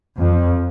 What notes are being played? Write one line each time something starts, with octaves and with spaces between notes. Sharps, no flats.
F2